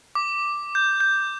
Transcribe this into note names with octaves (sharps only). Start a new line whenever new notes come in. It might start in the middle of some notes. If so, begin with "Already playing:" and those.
D6
G6
G6